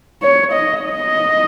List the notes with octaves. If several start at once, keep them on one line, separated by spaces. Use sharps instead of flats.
C#5
D#5
D#5